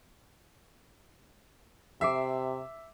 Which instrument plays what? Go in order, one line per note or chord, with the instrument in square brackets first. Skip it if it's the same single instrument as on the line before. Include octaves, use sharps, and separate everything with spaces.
[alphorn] C3 [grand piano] E5 [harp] D6 C7 E7